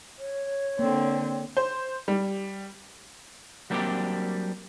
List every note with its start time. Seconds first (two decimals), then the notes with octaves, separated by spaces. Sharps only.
0.18 C#5
0.79 D3 A#3 C4
1.57 C5
2.08 G3
3.70 F#3 G3 A#3 C4 D4 G4